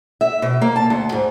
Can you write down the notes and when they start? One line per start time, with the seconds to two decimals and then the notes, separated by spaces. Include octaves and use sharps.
0.21 E5
0.42 B2
0.62 A#3
0.76 A5
0.90 D2
1.12 G#2